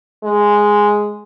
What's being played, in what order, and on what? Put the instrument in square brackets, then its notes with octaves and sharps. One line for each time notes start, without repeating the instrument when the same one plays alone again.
[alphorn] G#3